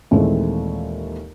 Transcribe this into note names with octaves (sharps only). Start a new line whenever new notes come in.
D#2 A#2 E3 G#3 A3 C4